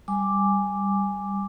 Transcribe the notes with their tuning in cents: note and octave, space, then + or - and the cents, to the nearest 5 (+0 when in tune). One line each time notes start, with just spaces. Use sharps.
G3 +0 G#5 +0 D6 +0